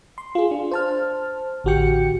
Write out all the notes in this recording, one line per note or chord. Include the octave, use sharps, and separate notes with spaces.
C6
F4 G#4
D4
C5 A5 F6
A1 D3 F#4 G4 G5 C#7